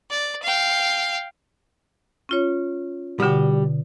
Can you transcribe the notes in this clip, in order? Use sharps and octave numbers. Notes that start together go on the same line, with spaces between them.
D5
F5 G5
C#4 F4 C#5
B2 D3 G3 F#4 G4